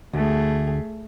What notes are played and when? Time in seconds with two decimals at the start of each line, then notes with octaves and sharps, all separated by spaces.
0.13 D2 A3 G#4